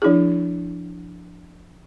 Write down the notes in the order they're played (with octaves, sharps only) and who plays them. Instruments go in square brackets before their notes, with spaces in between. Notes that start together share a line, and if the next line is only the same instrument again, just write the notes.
[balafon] F3 D4 E4 G#4